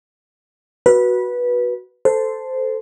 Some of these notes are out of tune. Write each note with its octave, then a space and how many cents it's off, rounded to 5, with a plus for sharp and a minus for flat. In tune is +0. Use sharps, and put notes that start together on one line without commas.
F#4 +0 B4 -15
A4 +0 C5 -10